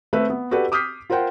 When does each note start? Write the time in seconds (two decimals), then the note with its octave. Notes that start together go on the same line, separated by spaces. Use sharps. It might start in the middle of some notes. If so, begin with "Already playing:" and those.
0.13 A3 C4 B4 E5
0.30 B3
0.51 F#4 G4 A4 B4 D5
0.72 D6 D#6 F6 G6 B6 C7
1.10 F4 A#4 C5 F#5 G5